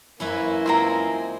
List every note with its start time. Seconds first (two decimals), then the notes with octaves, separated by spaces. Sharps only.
0.20 F#2 E3 A#3 C#4 E4 B4 C5
0.66 G#3 C4 F4 E5 A#5